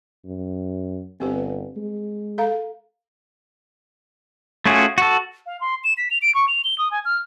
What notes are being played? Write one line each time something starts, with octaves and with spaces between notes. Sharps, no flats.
F#2
G1 C4 G4 B4
G#3
A4 F5 A#5
A3 C#4 F4 F#4 G#4
F#4 A4
F5
C6
E7
B6
F7
D7
C#6
F7
G7
D#6
G#5
F6